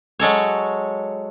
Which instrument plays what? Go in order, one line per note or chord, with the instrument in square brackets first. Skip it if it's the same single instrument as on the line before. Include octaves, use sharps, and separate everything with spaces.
[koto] F#3 G#3 A4 C#5